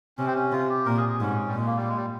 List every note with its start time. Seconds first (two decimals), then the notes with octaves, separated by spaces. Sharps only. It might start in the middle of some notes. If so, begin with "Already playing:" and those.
0.18 C3 C#4
0.26 C4
0.34 C#4
0.52 C3 F4
0.69 G4
0.86 A#2 A#4
0.97 G#4
1.09 G#4
1.21 G#2 C#4
1.48 G3
1.54 A#2 G#3
1.66 A#3
1.77 G3
1.89 G#3
1.97 G3